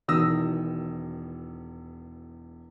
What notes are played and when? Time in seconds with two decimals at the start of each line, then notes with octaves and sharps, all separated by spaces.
0.08 E1 E2 D#3 D#6 E6 A#6